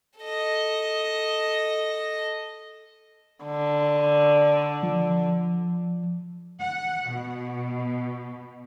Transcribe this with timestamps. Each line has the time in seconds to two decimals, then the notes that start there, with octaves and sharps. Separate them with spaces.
0.20 A4 D#5
3.45 D3
4.83 F3
6.61 F#5
7.09 B2